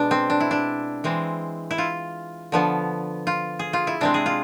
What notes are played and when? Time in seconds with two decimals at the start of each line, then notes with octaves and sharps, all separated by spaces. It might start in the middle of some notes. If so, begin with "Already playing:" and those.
Already playing: B2 G#3 B3 D4
0.11 C4
0.30 D4
0.40 E4
0.51 D4
1.04 E3 G#3 C4
1.71 E4
1.78 F4
2.52 D3 F3 B3
3.27 F4
3.59 G#4
3.73 F4
3.87 E4
4.01 C3 G#3 C4 D4
4.14 G#4
4.26 F4